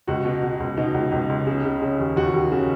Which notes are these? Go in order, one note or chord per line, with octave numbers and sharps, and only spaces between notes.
C#2 F#4
B2
B2
C#2
B2 D#4
C#2
C#2
C#2
C#3
C#3
C#3
D#2
D#2 F#4
D#2
C#3